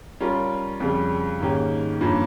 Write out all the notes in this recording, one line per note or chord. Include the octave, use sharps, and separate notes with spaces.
G3 C#4 F4 A#4
F2 C#3 G3
G#2 D#3 A#3 C#4 G4
G2 F3 A#3 C#4